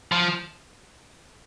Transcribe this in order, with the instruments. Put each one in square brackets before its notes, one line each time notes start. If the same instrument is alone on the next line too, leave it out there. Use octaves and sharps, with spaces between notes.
[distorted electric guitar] F3